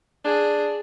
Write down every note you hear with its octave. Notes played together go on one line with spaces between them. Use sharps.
D4 G#4